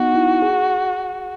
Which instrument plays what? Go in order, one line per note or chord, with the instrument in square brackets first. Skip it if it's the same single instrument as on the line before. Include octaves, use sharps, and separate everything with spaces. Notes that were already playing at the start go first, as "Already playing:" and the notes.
Already playing: [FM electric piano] B3 D#4 [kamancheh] F#4
[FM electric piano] E4
G#4